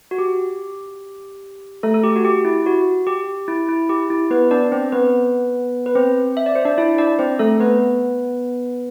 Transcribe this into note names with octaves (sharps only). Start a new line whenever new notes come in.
F#4
G4
A3 A4
A4
G4
F#4
G4
E4
F#4
G4
E4
E4
G4
E4
B3 B4
D4 D5
C4 C5
B3 B4
B4
C4 C5
E5
D5
C5
D4 D5
E4 E5
D4 D5
C4 C5
A3 A4
B3 B4